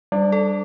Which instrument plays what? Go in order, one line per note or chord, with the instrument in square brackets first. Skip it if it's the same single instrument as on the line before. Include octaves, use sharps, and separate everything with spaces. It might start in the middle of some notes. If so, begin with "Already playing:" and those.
[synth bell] G3 [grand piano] D4
[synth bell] A4